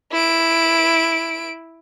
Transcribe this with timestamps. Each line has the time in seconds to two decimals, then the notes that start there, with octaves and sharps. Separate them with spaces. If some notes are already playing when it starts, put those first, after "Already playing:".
0.12 E4 D7